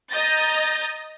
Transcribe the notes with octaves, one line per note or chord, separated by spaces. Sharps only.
D#5 A#5 D#6 G6 A6 A#6